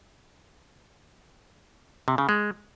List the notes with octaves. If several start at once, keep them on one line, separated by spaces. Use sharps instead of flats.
C3
C#3
G#3